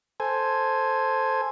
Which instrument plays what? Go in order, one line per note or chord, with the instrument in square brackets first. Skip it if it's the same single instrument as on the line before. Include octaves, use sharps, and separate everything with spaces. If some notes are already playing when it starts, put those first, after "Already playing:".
[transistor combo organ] A4 C5 G#5